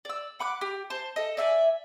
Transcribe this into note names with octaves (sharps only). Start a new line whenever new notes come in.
D5 E6
F#5 B5 D6 F#6
G4
C5 A5
A4 D#5
D5 E5 F5 G#5